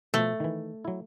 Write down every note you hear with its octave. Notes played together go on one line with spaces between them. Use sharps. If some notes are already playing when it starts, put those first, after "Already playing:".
B2 F3 A3
D#3 E3
F#3 E4